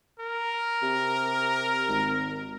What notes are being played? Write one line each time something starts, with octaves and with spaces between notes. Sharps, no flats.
A#4
C3
G#1